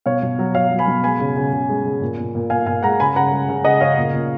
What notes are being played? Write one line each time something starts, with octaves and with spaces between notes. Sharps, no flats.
B2 C#5 F5
B2
F#3
F#3 C#5 F5
F#3
G#5 B5
B2
G#3 G#5 B5
C#3
C#3
C#3
G#3
G#3
A#2
A#2
A#2
A#2 F5 G#5
A#2 F5 G#5
G#3 F#5 A#5
C#3 G#5 B5
C#3 F#5 A#5
G#3
C#3
C#3 D#5 F#5
C#3 C#5 F5
A#2
A#2